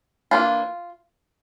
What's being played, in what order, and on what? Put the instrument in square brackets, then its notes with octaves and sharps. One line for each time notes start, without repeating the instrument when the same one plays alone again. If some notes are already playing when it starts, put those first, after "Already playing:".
[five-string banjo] E3 A#3 D4 F4